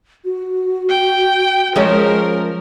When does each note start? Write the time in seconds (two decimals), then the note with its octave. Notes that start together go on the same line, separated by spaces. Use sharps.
0.25 F#4
0.89 G5
1.76 F3 G#3 C#4 A#4